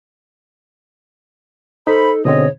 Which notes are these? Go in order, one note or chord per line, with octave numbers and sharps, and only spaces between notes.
D#4 A4 C5 B5
G#2 B2 D3 C4 C#5 D#5